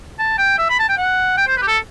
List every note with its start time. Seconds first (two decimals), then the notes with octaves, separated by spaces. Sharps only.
0.19 A5
0.38 G5
0.58 E5
0.69 B5
0.79 A5
0.89 G5
0.97 F#5
1.37 G5
1.47 C5
1.57 B4
1.62 G4
1.67 A4